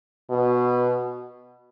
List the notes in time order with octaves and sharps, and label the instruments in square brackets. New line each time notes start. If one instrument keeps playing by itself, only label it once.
[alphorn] B2